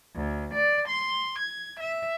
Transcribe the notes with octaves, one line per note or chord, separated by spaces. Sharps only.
D2
D5
C6
G#6
E5